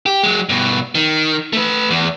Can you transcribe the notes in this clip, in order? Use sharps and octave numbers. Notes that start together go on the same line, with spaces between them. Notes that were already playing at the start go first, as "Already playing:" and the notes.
G4
F#3 G#3
G2 B2
D#3
A3 B4
E2